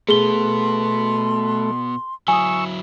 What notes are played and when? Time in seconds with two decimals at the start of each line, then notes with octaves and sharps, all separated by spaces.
0.09 B2 A3 B3 G#4 C6 G7
2.28 F#3 E4 G#5 C#6 D#6 E6